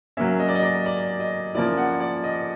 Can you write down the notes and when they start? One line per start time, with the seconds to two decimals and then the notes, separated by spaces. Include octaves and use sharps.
0.17 F#3 A#3 C#4 E5
0.39 D#5
0.48 D5
0.55 D#5
0.63 D5
0.86 D5
1.20 D#5
1.55 F3 A#3 C#4 E4 D5
1.78 F#5
2.00 D5
2.24 D#5